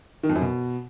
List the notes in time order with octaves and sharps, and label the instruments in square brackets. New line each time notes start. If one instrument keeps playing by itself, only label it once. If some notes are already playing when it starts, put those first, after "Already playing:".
[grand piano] D#3
F2
F#2
B2